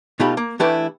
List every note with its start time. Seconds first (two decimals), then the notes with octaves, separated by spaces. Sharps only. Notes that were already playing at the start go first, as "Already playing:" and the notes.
0.20 B2 A3 D#4 F4 G4 B5
0.37 A#3
0.60 E3 A3 D4 E4 G4 B4